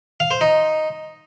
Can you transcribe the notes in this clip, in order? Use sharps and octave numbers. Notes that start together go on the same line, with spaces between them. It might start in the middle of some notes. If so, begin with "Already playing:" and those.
F5
C5
D#4